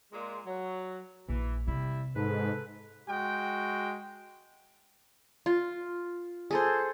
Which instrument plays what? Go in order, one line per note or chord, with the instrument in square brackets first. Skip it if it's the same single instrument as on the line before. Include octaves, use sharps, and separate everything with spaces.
[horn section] A#2 G#3
F#3
[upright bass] A#1 [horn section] E3
[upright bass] C3 [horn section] G3 E4
[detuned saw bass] G#2 [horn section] A4 B4
[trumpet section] G#3 F#4 G5
[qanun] F4
G#4 A4 C5